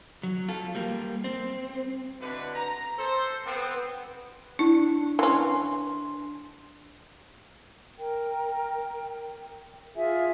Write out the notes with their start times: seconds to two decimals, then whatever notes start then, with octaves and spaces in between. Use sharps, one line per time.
0.23 F#3
0.48 F4 A4
0.75 G3 A#3
1.24 C4
2.20 B2 D3 G3 E4 B4
2.54 A#5
2.98 A4 C5
3.45 B3 C4
4.59 D4 E4
5.19 E3 C#4 C6
7.97 A#4 G5
9.95 F4 G#4 E5 G#5